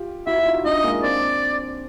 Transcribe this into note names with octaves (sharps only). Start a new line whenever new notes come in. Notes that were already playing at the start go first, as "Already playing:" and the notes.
Already playing: F4 G4
E4 F#4 E5
F#4
D#4 F4
D4 E4 D#5
G#3 A#3
C4 D4 D5